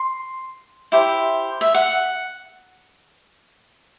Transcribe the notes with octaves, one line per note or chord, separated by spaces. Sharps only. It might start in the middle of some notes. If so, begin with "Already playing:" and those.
Already playing: C6
E4 G4 C5
E5
F#5